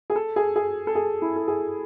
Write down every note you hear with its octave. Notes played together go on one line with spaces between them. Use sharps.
G#4
A4
G#4
G#4
A4
G#4
E4
A4
G#4